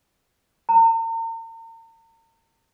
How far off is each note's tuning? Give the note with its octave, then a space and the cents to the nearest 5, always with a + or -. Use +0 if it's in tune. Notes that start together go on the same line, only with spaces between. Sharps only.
A#5 -40